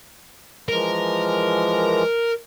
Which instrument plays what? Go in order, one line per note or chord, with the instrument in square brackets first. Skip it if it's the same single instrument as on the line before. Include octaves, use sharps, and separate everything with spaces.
[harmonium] E3 F3 G#3 [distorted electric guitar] A#4